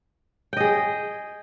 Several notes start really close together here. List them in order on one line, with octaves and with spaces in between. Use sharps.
G5 D#5 G#4